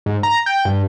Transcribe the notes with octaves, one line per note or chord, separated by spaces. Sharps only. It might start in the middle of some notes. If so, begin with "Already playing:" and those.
G#2
A#5
G5
G2